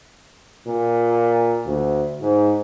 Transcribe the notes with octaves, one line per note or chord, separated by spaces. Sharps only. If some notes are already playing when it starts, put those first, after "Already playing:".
A#2
D2
G#2